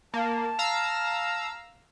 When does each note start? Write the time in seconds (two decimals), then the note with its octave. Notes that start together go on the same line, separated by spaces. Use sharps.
0.14 A#3 A5
0.59 F5 A#5 E6